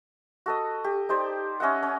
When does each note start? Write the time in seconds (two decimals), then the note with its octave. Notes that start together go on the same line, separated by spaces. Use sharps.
0.46 F#4 A4 D#5
0.84 G4
1.09 D#4 G4 C5 D5
1.60 C#4 D#5 E5 F#5
1.83 C#4